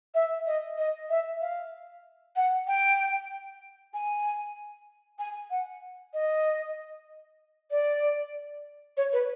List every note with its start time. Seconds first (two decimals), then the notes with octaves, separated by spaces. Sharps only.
0.14 E5
0.46 D#5
0.77 D#5
1.09 E5
1.41 F5
2.36 F#5
2.67 G5
3.93 G#5
5.18 G#5
5.50 F#5
6.13 D#5
7.70 D5
8.97 C#5
9.12 B4